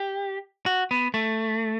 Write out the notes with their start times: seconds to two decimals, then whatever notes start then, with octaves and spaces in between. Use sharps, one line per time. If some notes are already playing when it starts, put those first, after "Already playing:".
Already playing: G4
0.66 F#4
0.91 B3
1.14 A3